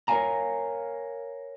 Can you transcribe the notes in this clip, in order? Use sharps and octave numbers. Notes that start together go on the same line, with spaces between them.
A#4 C#5 D5 F5 G#5 A#5